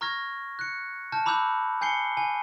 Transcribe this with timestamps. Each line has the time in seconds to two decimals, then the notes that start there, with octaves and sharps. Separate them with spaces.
0.01 A#5 C#6 F6 G#6 A#6
0.59 F#6 C#7
1.12 A5 F6 G6
1.26 A#5 B5 D6 E6 F#6 G6
1.81 G#5 G6 C7 C#7 G7
2.17 G#5